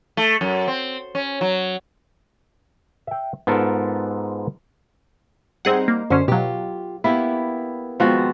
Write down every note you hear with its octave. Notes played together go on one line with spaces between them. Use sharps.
A3
F#2
C4
C#4
F#3
E5 G5
G#2 B3 F4 A4 A#4 A5
G3 C4 D#4 G#4 C5 F#5
A#3
F#2 D3 C#4 C5
B2 F#3 F4 G4
A#3 B3 E4 G4
D#2 F3 G#3 B3 C4 F#4